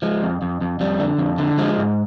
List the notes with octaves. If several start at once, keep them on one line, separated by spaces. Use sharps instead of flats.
F3 G#3
F2
F2
F2
F2 G3
D3
F2
D3
F3 G#3
G#2